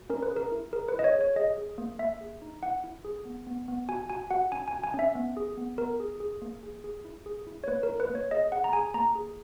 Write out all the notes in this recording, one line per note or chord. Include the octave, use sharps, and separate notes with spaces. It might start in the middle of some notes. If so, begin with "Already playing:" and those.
Already playing: F#4
C#4 A#4
B4
G#4
A#4
E4
G#4 A#4
B4
E4
D#5
C#5
G#4
C#5
G#4 D#5
G#4
A#3
A#3 E5
G#4
D#4
E4 F#5
E4
G#4
B3
B3
B3
F#4 G#5
F#4 G#5
F#4 F#5
C#4 G#5
G#5
F#4
G#5
C#4
E5
B3
G#4
B3
B3 A#4
G#4
G#4
A#3
G#4
G#4
E4
G#4
E4
C#5
A#3 B4
A#4
E4
B4
A#3
C#5
G#4 D#5
G#4 F#5
A#5
G#4 G#5
A#3 A#5
G#4